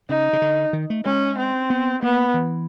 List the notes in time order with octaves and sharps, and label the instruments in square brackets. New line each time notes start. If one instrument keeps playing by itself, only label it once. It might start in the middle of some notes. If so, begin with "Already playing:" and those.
[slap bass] C#3 [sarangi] D#4
[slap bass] C#3
D3
D#3
A3
[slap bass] G#3 [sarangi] C#4
[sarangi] C4
[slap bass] B3
[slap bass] A#3 [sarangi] B3
[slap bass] E3